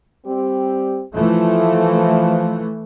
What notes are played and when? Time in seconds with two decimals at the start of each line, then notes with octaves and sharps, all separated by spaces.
0.26 G3 C4 G4
1.15 E3 F3 A3